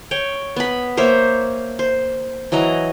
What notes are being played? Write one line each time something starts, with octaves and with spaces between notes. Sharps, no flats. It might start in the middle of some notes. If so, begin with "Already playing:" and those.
C#5 G5
B3 B5
A#3 C5 C#5 E5
C5
E3 F#3 D#5 A#5